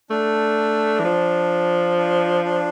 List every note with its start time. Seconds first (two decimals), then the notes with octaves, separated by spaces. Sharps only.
0.10 A3 D4
1.00 E3
1.04 F3
1.97 D4
2.44 D4